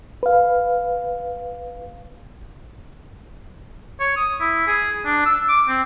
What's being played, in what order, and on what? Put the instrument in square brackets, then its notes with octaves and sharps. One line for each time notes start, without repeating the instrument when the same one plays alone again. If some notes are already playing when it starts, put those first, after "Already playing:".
[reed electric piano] B4 F5
[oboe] C#5
D#6
E4
G#4
D4
E6
D6
C4